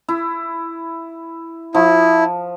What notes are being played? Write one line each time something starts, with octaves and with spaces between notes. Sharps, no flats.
E4
F3 E4